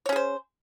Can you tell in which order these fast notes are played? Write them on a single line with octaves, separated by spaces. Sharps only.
C#5 C#4 G#4 C5